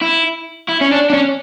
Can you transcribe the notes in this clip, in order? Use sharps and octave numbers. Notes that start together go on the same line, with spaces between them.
E4
E4
C#4
D4
D4
C#4